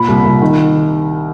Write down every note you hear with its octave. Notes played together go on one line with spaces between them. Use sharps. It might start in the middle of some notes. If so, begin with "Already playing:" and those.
Already playing: A#2 B5
C2
C2
D#3